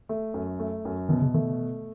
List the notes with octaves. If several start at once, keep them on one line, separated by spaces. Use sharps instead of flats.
A3
F#2
A3
F#2
B2 D#3
C#3
D#3 A3